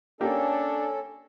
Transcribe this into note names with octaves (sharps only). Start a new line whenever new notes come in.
A#3 C#4 D4 G4 A4